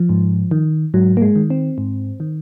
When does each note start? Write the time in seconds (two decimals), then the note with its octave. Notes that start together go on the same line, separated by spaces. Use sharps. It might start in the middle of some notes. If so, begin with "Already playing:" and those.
Already playing: F3
0.09 G#2
0.51 D#3
0.94 G#2 F#3
1.17 A#3
1.22 G#3
1.36 D#3
1.50 C4
1.78 G#2
2.20 D#3